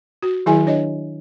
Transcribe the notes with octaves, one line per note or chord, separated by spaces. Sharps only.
F#4
D#3 F#3 E4 G#4 E5 G#5
D4 C#5 D#5